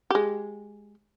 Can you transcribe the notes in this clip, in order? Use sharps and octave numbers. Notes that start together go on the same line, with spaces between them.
G#3 G4